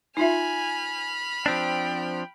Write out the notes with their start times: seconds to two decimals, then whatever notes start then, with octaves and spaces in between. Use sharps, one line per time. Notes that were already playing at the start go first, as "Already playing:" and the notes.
0.17 D#4 F4 E5 G#5 B5 F6
1.46 F3 C4 D4 G5